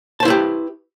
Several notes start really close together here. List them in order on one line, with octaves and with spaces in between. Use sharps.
A5 C5 E4 B4 G4